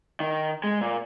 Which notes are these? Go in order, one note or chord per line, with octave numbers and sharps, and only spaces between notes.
D#3
G#3
A#2